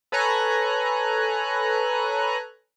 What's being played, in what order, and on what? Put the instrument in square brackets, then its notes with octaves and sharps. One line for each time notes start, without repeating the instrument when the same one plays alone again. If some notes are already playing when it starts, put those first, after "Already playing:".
[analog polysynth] A4 B4 C#5 G#5 A#5 F#6